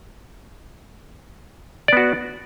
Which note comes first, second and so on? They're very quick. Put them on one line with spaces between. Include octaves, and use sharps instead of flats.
D5 B3 F#4